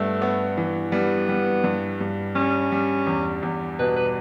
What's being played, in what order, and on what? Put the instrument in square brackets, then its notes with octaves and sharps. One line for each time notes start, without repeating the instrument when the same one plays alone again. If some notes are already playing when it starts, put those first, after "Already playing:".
Already playing: [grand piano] G2 B3 [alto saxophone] A3
[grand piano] B3
E3
[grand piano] G3 [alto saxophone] B3
[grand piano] G3
G2
G2
[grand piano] G3 [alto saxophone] C#4
[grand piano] G3
E2
E2
[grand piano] B2 [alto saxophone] B4
[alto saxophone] B4